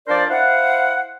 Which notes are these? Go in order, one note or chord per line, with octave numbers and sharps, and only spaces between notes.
F3 D4 A#4 C5 D5
E4 C5 F5 F#5